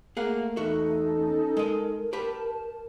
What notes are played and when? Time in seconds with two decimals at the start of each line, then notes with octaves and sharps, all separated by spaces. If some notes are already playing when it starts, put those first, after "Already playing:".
0.17 A3 A#3 G#4 F5 F#5
0.56 E2 D#4 F#4 A4 E5
1.17 C#4
1.57 G#3 A#4 D#5
2.13 G4 B4 A5